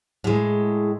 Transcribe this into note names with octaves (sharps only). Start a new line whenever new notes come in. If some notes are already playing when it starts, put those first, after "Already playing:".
A2 G#3